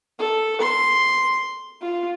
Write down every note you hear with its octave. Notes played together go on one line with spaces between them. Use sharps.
A4
C6
F4